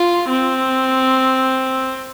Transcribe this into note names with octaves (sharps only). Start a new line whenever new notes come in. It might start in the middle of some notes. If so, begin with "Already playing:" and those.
Already playing: F4
C4